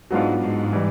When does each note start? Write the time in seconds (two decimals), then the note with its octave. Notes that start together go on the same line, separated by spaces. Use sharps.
0.11 G#2 F#3 B3 D4 F4
0.40 G#2
0.73 E3 G3